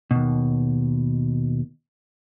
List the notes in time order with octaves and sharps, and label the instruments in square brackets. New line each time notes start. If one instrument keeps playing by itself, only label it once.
[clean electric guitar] D#2 B2